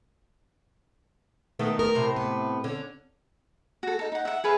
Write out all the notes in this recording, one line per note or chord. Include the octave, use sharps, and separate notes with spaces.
D#3 A3 B3
A#4
A2 C3
B3
D3 C#4
F#4 A4
D#4 A4
D#4 F#5
E5 F#5
G#4 B4 E5 F5